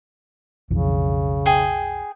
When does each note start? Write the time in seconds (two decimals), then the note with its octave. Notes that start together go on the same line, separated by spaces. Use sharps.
0.71 B1 F2 C#3 E3
1.46 G#4 G5